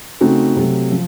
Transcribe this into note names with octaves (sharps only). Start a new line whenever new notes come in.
C#3 A3 C4 D#4 F#4
C3 F#3 A3
F3